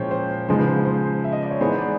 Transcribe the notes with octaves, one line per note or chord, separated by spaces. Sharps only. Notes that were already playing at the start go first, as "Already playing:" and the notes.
Already playing: A#2 F3 G#3 C#4 E4 C5 C#5 G5
C5
C#3 F3 G#3 B3 D#4 C5
C5
C5
E5
D#5
D5
C#5
E3 G#3 B3 D#4 C5
D5